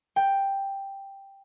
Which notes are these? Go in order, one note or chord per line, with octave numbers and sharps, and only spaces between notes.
G5